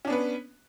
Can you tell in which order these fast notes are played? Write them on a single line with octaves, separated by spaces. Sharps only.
C#4 D4 B3 B4